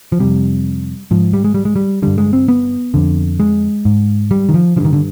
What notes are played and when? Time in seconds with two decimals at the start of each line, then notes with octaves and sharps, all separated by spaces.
0.12 F3
0.20 F2 C3 G3
1.11 G#2 F3
1.34 G3
1.45 G#3
1.54 G3
1.65 G#3
1.76 G3
2.02 G2 D3 G3
2.18 G#3
2.33 C4
2.48 B3
2.94 F2 D3
3.40 G#3
3.85 G#2
4.31 G3
4.49 D#3
4.54 F3
4.76 D3 F3
4.80 G2 D#3
4.93 D3